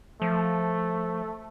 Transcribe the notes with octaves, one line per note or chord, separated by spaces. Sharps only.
F3 A3